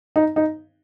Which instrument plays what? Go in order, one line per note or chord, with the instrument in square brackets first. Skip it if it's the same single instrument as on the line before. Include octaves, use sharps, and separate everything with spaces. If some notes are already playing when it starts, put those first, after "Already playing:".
[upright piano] D#4
D#4